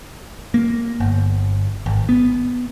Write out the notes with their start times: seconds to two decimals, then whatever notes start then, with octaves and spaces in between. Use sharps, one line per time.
0.54 A#3
1.00 G1
1.86 G#1
2.09 B3